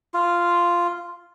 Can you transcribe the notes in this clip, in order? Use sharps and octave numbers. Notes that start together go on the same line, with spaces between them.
F4